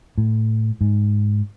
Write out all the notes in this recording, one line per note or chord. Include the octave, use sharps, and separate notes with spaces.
A2
G#2